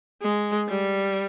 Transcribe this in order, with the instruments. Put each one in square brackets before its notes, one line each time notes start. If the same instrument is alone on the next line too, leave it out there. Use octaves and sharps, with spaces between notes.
[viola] G#3
G3